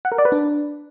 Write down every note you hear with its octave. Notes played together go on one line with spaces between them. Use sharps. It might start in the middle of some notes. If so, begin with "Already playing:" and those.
F#5
A#4
D5
B4
D4